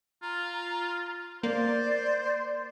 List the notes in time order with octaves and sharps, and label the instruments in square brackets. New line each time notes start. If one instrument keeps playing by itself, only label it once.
[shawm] F4 [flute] A#5
[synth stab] A#3 [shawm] C5 [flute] D5